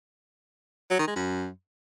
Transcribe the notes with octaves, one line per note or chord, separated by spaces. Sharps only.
F#3
D#3
G#3
F#2